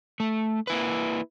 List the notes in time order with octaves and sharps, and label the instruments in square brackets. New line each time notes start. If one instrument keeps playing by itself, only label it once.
[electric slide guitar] A3
A#3 E4 B4